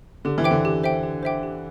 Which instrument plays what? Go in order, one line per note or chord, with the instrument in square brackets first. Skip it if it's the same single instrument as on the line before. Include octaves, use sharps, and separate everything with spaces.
[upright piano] D3 [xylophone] G4
[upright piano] E3
[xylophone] C5 E5 G5 D6
[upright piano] D3
[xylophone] G4
C5 E5 G5 D6
G4
C5 E5 G5 D6
G4